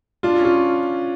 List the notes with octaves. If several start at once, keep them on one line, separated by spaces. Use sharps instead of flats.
D4 F4
C#4
F4